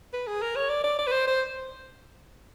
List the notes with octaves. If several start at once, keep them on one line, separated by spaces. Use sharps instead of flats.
B4
G#4
A#4
C#5
D5
D5
D5
B4
C5
C5